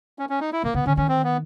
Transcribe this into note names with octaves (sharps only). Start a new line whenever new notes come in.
C#4
C#4
D#4
E4
C3 A#3
C#3 B3
D3 C#4
D#3 C#4
C4
B3